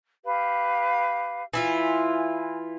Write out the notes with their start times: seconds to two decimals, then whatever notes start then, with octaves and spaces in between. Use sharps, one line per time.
0.25 G4 B4 F5
1.54 E3 E4 F4 G#5